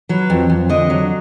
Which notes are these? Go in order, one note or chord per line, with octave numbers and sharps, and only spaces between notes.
F#3 B4
F2
F2
D3 D#5
F#3